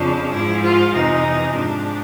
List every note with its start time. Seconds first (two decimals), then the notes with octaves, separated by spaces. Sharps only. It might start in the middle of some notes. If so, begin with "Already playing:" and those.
Already playing: F2 C#3 F3 D4
0.32 G#2 F3 E4
0.62 F4
0.92 F2 C3 E3 D#4
1.53 G#2 F3 D4